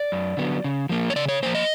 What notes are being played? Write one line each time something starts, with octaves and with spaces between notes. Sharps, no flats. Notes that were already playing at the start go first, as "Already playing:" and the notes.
Already playing: D5
F#2
D3 F#3 B3
C#3
F3 A#3
C#5
C#3 D5
C#5
F3 A#3 C5
D#5